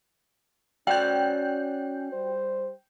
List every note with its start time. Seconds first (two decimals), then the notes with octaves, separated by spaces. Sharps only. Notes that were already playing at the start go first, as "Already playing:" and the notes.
0.87 C#4 F#4 D5 F#5 G5 G6
2.12 G3 C5